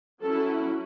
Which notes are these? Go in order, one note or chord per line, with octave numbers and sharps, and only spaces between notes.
F#3 C#4 E4 A4